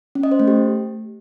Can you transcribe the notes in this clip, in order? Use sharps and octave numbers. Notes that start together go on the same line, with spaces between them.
C#4
D#5
C5
A3
G4